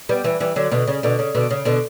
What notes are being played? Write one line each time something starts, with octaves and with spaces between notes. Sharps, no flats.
G3 B3
E3 G3
E3 G3
D3 F#3
B2 D3
C#3
B2 D3
C#3
B2 D3
C#3
B2 D3